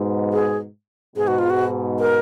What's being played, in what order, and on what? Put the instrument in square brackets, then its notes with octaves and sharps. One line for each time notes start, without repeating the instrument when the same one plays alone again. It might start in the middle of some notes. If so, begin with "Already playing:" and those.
Already playing: [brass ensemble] G#2 B2
[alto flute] G#4
[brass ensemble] G#2 B2 [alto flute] G#4
[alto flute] F#4
F4
F#4
A#4